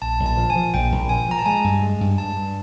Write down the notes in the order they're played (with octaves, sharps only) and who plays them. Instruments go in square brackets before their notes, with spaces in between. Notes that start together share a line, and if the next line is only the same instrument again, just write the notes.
[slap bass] A#1 [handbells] A5
[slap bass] A#1
[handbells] A5
[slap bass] F3
[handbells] G#5
[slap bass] F3
[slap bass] A#1 [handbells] G5
[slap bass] A#1
[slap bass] F3 [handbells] G#5
[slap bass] F3 [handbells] A#5
[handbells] A5
[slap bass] G#3 [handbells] G#5
[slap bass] G2
G#3
G2
[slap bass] G2 [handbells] A5
[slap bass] G2